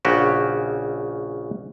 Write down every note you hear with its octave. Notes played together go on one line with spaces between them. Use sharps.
A#1 C#3 F#4 G4